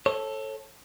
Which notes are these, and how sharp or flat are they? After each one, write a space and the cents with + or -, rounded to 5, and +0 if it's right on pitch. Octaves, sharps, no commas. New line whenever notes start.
A4 +0 C#5 -30